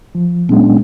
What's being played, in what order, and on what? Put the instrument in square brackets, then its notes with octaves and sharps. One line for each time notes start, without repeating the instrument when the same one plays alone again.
[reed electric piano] F3
[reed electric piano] A#2 F#3 G#3 [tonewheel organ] B3 C#4 D4